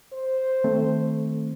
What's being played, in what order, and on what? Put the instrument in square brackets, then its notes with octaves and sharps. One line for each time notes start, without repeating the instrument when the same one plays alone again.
[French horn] C5
[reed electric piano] D#3 A3 C4